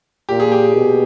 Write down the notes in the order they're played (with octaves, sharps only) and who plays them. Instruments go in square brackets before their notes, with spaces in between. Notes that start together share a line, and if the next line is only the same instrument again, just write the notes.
[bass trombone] A#2 [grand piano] G4
[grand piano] G#4
G4
[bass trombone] B2